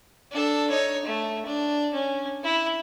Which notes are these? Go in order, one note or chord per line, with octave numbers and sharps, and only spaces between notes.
D4 A4
D#4 C#5
A3
D4
C#4
E4